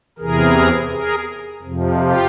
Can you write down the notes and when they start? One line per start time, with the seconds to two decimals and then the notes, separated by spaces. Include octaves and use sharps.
0.19 E2 C3 E3 G#4 A#4
0.90 G#4 A#4
1.62 F2 C3 F3
1.98 F4 G4